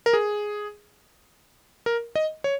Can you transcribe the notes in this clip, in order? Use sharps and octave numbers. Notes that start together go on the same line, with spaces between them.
A#4
G#4
A#4
D#5
C#5